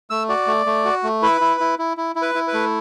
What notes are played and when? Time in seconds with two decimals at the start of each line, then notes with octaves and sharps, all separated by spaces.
0.10 A3 E6
0.29 F#4 D5
0.47 A3
0.66 A3
0.85 F#4
1.04 A3
1.22 E4 B4
1.41 E4
1.60 E4
1.79 E4
1.97 E4
2.16 E4
2.22 B4
2.35 E4
2.48 B4
2.53 A3